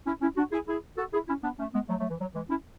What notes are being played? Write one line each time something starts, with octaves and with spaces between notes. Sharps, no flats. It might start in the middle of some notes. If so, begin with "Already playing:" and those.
C#4 E4
C#4 E4
D4 F#4
E4 G#4
E4 G#4
F#4 A4
E4 G#4
C#4 E4
B3 D4
A3 C#4
G#3 B3
F#3 A3
F#3 A3
E3
F#3
E3 G#3
C#4 E4